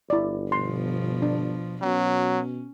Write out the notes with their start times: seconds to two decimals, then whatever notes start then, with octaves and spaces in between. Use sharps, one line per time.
0.10 G1 E4 D5
0.52 B2 F3 C6
1.22 D4
1.82 B2 F#3 C#4